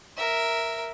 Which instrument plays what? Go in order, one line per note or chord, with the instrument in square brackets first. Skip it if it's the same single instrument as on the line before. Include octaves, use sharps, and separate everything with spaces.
[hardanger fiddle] A#4 E5